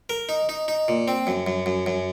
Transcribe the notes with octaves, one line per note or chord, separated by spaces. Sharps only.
A#4
D#4
D#4
D#4
A#2
C4
F#2
F#2
F#2
F#2